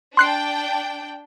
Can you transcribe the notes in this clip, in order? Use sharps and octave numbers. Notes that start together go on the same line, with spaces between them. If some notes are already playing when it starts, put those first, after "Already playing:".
D4 G5 C6 F#6 C7